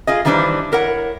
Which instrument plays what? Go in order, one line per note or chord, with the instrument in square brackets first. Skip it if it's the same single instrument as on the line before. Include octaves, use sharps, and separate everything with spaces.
[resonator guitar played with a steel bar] F4 G#4 D#5
D#3 E3 G3 D4 B4 C5
E4 A#4 C#5 F#5